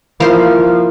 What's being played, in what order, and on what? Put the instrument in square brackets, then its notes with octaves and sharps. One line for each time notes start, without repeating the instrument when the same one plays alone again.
[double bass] F3 [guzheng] A#3 C5 C6 [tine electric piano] E4